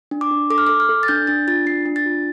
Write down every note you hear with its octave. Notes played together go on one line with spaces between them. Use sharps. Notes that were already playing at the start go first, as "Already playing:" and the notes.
D4
D6
D4
A4 D6
F6
A4 D6
F6
A4
A6
D4 G6
D4 A6
F4 A6
D4 C7
D4
A6
F4